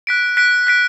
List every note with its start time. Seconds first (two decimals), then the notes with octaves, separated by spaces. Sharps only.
0.07 F#6 B6 D7
0.37 F#6 B6 D7
0.67 F#6 B6 D7